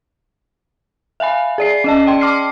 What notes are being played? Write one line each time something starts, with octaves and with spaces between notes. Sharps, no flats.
E5 F5 G#5 B5
G#4 D5 C7
C#4 D#5 A5
D5 G5 C6
A5 C6 D6 F6 C7